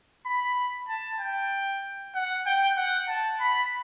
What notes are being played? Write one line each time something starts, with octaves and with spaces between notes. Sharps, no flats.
B5
A5
G5
F#5
G5
F#5
A5
B5